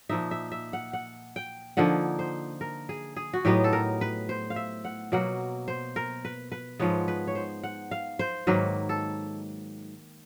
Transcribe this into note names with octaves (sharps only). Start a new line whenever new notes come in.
A#2 F3 A#3 D#4 E5
E5
E5
F#5
F#5
G5
D3 F3 A#3 D#4 F#5
C5
A#4
G#4
G#4
F#4
A2 F#3 B3 D#4 G4
A4
A#4
B4
C5
F5
E5
F#5
B2 F#3 A#3 F#5
C5
A#4
B4
B4
G#2 F3 G#3 B3 C#5
B4
C#5
C5
F#5
F5
C5
G#2 D#3 F#3 A#3 B4
A4